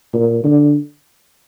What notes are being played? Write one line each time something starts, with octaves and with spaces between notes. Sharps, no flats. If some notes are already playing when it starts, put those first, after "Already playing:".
A#2
D3